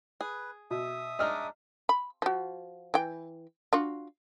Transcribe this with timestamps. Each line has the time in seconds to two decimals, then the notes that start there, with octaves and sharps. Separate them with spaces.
0.21 G#4 B4
0.71 B2 E5 D#6
1.19 G#3 D4 D#4 D#5 F6
1.89 B5
2.22 F3 F#4
2.94 E3 G5
3.73 D4 F4 F#4